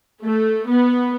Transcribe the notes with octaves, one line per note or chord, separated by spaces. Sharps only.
A3
B3